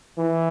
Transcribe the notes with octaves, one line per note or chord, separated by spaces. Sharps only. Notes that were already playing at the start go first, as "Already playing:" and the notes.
E3